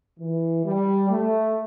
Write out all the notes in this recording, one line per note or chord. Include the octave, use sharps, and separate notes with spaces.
E3
G3
A3